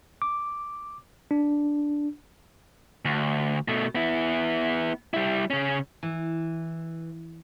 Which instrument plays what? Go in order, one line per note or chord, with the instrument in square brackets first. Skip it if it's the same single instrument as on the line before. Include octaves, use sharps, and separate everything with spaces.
[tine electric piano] D6
D4
[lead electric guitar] D2
B2 A3
B3 E4
G3 E4
C#3 C#4
[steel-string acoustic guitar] E3